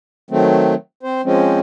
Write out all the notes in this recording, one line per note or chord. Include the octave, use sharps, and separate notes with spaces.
D#3 F#3 A3 C4
C4 C5
F3 G#3 C4 C#4